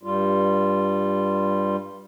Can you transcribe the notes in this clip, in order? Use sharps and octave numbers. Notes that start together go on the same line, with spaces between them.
G2 G3 F4